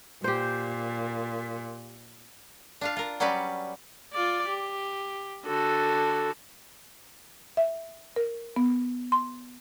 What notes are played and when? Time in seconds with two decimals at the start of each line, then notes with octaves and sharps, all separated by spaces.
0.24 A#2 G4 C5
2.81 D4 F4 F5
2.97 F4 A#4
3.20 F#3 G3 C#4 F#4 B4 D5
4.13 F4 D5
4.48 G4
5.46 D3 F#4 A4
7.57 E5
8.16 A#4
8.56 B3
9.12 C6